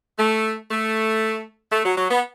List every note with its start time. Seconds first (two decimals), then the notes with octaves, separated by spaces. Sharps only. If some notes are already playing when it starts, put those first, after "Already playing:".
0.19 A3
0.71 A3
1.72 A3
1.85 F#3
1.97 F#3
2.11 B3